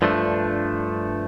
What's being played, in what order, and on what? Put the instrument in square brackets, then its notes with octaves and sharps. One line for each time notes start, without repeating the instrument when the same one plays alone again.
[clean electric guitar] G2 F3 A3 D4